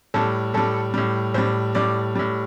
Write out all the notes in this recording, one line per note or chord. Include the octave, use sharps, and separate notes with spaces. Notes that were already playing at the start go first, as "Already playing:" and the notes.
A2 G3 A4
A2 G3 A4
A2 G3
A2 G3 C5
A2 G3 D5
A2 G3